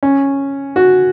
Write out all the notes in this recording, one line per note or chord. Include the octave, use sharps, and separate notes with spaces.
C#4
F#4